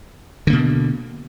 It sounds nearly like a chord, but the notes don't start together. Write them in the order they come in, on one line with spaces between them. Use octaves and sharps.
D3 A#3 B2